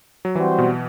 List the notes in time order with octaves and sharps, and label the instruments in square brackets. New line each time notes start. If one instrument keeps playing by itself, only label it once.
[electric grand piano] F#3
[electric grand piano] E3 [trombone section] G3 C4 F#4 C5
[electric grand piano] B2